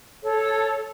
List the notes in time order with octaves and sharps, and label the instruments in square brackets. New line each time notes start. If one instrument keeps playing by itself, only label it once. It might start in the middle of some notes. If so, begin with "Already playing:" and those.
[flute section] A4 C#5